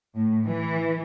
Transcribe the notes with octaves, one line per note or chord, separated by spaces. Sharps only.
A2
E3